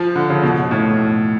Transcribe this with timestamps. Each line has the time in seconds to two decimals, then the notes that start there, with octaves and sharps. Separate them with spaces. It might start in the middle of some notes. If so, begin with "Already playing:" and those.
Already playing: F3
0.16 D3
0.30 C#3
0.43 B2
0.71 A2